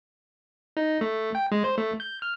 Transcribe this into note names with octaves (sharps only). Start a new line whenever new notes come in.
D#4
A3
G5
G#3
C5
A3
G6
F6